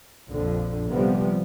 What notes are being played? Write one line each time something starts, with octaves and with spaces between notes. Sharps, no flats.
A#1 F2 D3 F3
C3 F3 G3 B3